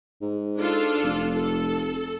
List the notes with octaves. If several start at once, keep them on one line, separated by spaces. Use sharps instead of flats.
G#2
D4 F4 A4
F1
A4